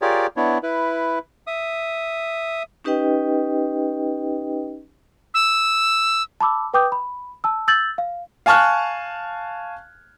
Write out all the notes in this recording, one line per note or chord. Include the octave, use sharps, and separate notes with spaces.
F4 G4 G#4 A#4 C#5 D5
B3 D4 E4 C#5
E4 B4
E5 D#6
C#4 D#4 G4 B4 D#5 G5
E6
A5 B5 D6 E6
B4 G5 D6 D#6 G6
B5
A5 E6
E6 G6 A6 F#7
F5
F5 G#5 A5 C#6 F6 F#6